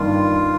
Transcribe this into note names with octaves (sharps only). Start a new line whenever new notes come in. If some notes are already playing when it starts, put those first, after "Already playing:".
Already playing: G2 D#3 A#3 D4 F4